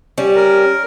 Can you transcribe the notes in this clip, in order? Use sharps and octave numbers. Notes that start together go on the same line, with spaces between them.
G3 C#4
A#4